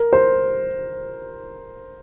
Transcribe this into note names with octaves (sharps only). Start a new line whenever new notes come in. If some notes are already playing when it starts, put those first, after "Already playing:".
Already playing: A#4
C5